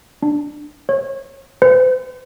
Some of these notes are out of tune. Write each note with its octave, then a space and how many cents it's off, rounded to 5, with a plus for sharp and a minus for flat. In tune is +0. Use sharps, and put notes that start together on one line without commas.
D4 +10
C#5 -30
C5 -40